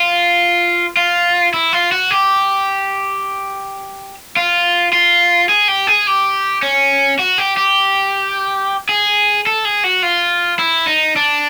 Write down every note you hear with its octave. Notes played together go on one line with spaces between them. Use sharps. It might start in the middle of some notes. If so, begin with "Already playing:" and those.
Already playing: F4
F4
E4
F4
F#4
G4
F4
F4
G#4
G4
G#4
G4
C#4
F#4
G4
G4
G#4
A4
G#4
F#4
F4
E4
D#4
D4